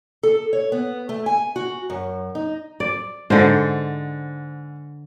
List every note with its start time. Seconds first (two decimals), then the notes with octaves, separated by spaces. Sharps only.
0.23 A4
0.53 C#5
0.72 B3
1.09 A3
1.26 G#5
1.56 F#4
1.90 F#2
2.35 D#4
2.80 D5
3.30 G#2 D3 C5